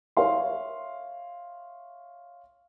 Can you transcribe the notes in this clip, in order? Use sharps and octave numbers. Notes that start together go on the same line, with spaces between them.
C#5 E5 F5 C6